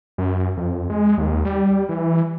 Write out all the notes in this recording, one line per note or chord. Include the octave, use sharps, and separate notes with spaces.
F#2
F2
G#3
D#2
G3
E3